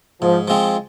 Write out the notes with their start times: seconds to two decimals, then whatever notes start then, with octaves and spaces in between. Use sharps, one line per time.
0.21 G#2 F3
0.48 F3 G#3 C4